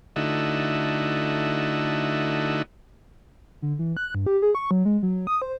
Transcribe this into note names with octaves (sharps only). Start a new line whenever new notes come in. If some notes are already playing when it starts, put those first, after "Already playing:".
D3 A3 D#4 E4 F#4
D3
E3
F#6
G2
G4
G#4
C#6
F#3
G#3
F#3
D#6
C5